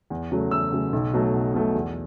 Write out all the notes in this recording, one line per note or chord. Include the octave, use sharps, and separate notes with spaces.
E2
C#3 F#3 A3
E2 E6
C#3 F#3 A3
B1
B2 F#3 A3
B1
B2 F#3 A3
E2